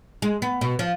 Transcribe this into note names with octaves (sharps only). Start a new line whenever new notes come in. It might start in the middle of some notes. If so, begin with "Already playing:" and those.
G#3
B3
B2
F3